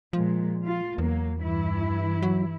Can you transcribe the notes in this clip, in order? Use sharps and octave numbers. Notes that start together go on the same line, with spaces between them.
A#2 F3 G#3
F4
E2 F#3 A#3
G2 E3 E4
F#3